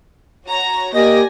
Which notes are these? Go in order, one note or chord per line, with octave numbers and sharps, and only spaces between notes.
F#4 C#5 A#5
A#3 G4 D5 D#5 G#5 A#6